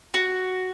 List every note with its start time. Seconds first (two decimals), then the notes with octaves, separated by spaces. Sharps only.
0.14 F#4